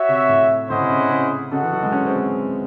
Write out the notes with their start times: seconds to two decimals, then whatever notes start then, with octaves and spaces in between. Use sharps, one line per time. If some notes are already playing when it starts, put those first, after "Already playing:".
Already playing: F#4 C#5 E5
0.09 C3
0.29 A2
0.70 A2 C#4 E4 C5 D#5 F#5
0.80 C3
0.91 C#3
1.11 C#3
1.52 C#3 F#4 A4 D#5 F#5
1.62 E3
1.72 F#3
1.83 G#3
1.92 C#4
2.06 C4